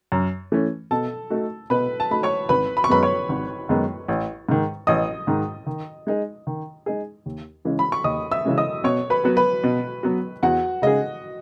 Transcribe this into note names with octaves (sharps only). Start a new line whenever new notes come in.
F#2
E3 A3 C#4
B2 A4 A5
A3 D#4 F#4
B2 B4 B5
A5
A3 D#4 F#4 B5
C#5 C#6
G#1 B4 B5
B5
C#6
F#2 D#3 G#3 B3 B4 B5
C#5 C#6
G#1
F#2 D#3 G#3 B3
A1
G#2 D#3
A1 D#5 D#6
G#2 D#3
D#3
G#3 D#4 G#4
D#3
G#3 D#4 G#4
D#2
C#3 E3 G#3 C#4
B5
C#6
D#2 D#5 D#6
E5 E6
C#3 E3 G#3 C#4
D#5 D#6
B2 C#5 C#6
B4 B5
F#3 B3 F#4
B4 B5
B2
F#3 B3 F#4
E2 F#4 F#5
C#3 G#3 D#4 G#4 D#5